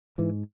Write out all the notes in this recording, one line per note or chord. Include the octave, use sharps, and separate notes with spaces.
G#2 E3